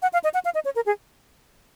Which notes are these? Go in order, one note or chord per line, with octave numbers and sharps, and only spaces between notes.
F#5
F5
D#5
F#5
F5
D#5
C#5
A#4
G#4